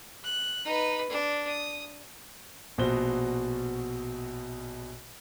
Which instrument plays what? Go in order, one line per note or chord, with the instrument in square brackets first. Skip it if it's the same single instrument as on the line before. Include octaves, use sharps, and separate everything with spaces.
[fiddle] F#6
D#4 B4
D4
D#6
[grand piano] A#1 B2 F#4 C5 G7